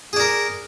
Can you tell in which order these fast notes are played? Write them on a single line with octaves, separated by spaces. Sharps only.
G#4 D4 A#4